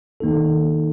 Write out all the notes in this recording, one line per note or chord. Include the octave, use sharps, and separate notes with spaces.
D#3 A#3 D#4 A4